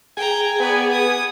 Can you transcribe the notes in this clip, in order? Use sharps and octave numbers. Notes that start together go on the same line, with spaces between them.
G#4 G5 G#5 A#5
B3 B4 D5
D#6